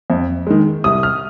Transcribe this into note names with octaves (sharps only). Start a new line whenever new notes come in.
F2
D#3 G#3
C2 D#6
F6